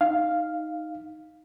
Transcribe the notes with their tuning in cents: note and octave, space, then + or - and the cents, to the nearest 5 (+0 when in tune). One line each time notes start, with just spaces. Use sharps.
D#4 +0 F5 +0